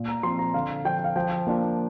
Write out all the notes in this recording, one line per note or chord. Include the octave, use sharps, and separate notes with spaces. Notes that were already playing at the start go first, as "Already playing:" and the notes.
Already playing: A#2
A#5
F3 C4 F4 C6
A#5
D3 F5
F3 D4 G5
F5
F3 G5
A#3 D4 F4